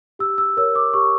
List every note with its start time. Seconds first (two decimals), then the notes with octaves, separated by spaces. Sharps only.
0.19 G4 E6
0.38 E6
0.57 A#4 C#5 E6
0.75 D6
0.94 G4 C#6